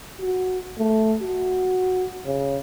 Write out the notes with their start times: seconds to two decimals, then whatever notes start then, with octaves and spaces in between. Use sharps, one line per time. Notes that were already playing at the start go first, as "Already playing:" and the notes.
0.21 F#4
0.79 A3
1.22 F#4
2.26 C#3